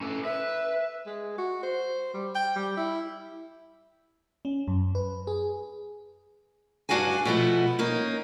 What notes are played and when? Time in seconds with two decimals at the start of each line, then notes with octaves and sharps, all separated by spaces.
0.01 C#4 A4 B4
0.25 B4 E5
1.06 G#3
1.38 F#4
1.63 C5
2.14 G3
2.35 G5
2.56 G3
2.77 E4
4.45 C#4
4.68 F#2
4.95 B4
5.27 G#4
6.89 G2 E3 D4 F#4 F5 G#5
7.25 B2 F3 A3 B3
7.79 A#3 C#4 D#4